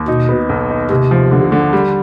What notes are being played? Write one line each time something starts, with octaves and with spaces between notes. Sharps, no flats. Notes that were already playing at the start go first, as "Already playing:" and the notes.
Already playing: D#2
B2 D#4
B3
B1
D#4
D#2 C3
F3
D3
D3
G3